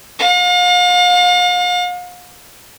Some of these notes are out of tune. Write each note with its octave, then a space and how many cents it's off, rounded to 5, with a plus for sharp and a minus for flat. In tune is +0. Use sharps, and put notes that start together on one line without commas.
F5 +40